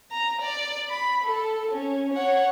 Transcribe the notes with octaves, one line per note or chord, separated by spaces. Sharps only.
A#5
D5
B5
A4
C#4
C#5 F#5